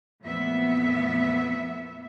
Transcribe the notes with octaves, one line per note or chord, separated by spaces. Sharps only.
F2 A#2 E3 A3 B3 E5